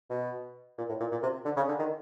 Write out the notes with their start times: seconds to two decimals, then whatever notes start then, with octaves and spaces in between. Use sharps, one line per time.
0.10 B2
0.78 A#2
0.89 A2
1.00 A#2
1.12 A#2
1.23 C3
1.45 D3
1.56 C#3
1.68 D3
1.79 D#3